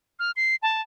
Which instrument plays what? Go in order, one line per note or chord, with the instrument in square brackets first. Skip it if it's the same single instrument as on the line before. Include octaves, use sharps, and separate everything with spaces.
[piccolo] F6
C7
A5